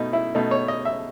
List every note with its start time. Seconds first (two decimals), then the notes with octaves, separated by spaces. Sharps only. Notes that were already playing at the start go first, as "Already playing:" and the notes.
Already playing: B2 A3 D#4
0.13 E4
0.35 B2 A3 D#4
0.51 C#5
0.68 D#5
0.85 E5